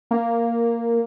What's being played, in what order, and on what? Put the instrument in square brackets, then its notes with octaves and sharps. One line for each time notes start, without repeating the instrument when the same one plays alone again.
[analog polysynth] A#3